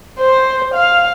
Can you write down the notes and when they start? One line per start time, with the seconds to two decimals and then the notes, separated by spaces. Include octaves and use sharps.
0.20 C5
0.74 F5